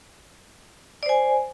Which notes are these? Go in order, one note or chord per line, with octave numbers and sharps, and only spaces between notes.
C5 D5 G#5